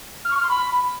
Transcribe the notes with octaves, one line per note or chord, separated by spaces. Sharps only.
F6
C#6
F6
C6
B5